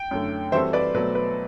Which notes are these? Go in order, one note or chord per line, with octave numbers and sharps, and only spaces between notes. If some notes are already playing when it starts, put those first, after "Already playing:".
Already playing: G5
F#2 D3 A3
E3 G3 C4 F#4 A4 C5 E5
B4 D5
B2 F#3 A3 B4
B4